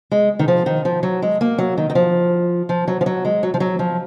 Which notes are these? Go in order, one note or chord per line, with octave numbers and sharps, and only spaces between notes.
G#3
D#3
F3
D#3
F3
F#3
G#3
A#3
F#3
D#3
D#3
F3
F3
F#3
F3
F#3
G#3
F#3
F3
F#3
F3